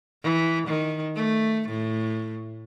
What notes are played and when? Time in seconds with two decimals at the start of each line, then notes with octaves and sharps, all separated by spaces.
0.23 E3
0.67 D#3
1.15 A3
1.69 A2